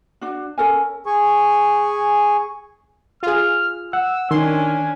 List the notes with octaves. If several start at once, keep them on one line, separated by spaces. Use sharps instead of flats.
D4 F#4
C#4 A4 A#4 G#5
G#4 G#5 C#6
F4 G#4 F6
F#5 E6
D#3 C#4 D4 G#5 C6